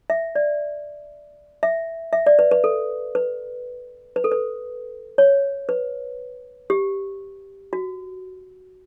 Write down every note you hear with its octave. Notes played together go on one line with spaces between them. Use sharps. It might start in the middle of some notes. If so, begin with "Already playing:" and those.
E5
D5
E5
E5
D5
B4
B4
A4
B4
B4
A4
B4
C#5
B4
G4
F#4